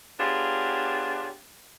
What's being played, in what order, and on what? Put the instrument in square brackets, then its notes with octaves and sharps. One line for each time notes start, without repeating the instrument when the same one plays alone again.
[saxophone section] B3 D4 F4 G4 G#4 C#5